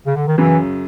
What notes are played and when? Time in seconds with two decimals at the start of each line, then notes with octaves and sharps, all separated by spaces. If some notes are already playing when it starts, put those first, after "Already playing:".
0.05 C#3
0.15 D3
0.27 D#3
0.37 F#2 C#3 E3 F#3